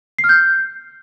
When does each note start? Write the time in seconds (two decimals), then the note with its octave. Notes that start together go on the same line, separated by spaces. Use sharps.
0.19 C7
0.24 F6
0.29 G6